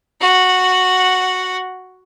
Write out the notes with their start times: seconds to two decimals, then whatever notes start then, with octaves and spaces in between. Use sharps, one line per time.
0.21 F#4 F#5